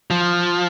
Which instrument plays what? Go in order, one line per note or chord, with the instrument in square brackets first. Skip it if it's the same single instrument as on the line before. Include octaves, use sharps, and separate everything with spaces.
[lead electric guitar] F3